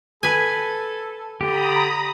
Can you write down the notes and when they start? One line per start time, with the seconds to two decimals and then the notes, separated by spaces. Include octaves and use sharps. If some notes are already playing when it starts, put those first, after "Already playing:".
0.23 A4 B4 G#5
1.41 D3 G4 A#5 B5 D#6